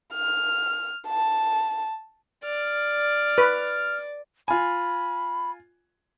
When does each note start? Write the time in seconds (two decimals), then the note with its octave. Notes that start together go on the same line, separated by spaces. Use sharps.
0.14 F6
1.08 A5
2.44 D5 F6
3.38 B4
4.48 F4 G#5 B5